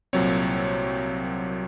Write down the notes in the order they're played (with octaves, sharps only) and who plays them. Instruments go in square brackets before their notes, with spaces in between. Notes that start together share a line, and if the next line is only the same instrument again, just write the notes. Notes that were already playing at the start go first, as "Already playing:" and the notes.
[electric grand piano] C2 A#2 F#3 C4 C#5